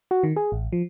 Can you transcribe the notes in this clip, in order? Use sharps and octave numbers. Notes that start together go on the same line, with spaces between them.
F#4
D#3
G#4
A1
F3